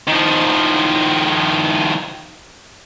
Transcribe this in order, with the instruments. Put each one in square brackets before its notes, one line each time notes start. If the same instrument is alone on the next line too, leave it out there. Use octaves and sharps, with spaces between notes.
[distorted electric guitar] D#3 F3